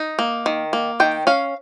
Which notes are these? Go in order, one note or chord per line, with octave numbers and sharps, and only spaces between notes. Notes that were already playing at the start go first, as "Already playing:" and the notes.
Already playing: D#4
A#3
D#3
A#3
D#3 G5
C#4 F5